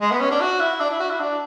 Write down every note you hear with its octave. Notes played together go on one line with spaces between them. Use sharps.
G#3
B3
C#4
D4
F#4
E4
D4
E4
F#4
E4
D4